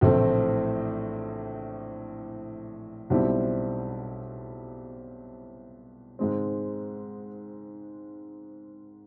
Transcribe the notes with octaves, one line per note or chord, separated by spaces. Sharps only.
A#1 A2 E3 A3 C4
B1 B2 G3 C4 E4
G#2 D#3 G#3 C4